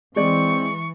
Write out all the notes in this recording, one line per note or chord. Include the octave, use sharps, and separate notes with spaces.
E3 G#3 C4 D5 C#6